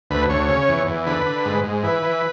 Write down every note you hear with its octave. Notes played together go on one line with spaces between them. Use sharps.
D2 B4
D2 C#5
C#3
E2
E2
D3 B4
D3
G#2
G#2
E3 B4
E3